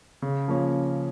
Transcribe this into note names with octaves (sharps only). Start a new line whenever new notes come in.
C#3
F3 A#3 C#4